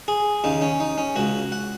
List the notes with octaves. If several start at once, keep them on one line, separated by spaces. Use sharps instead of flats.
G#4
D#2 C#3 D#4
C#4
D#4
C#4
C#2 C#3 F#4
F#5